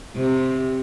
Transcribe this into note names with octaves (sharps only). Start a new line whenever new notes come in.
C3